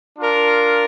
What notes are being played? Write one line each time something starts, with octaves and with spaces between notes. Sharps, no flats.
D4 F4 A#4